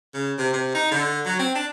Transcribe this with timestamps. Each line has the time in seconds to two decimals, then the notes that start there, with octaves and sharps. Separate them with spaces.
0.14 C#3
0.38 C3
0.54 C3
0.75 D#4
0.92 D3
1.26 F#3
1.39 C4
1.56 D4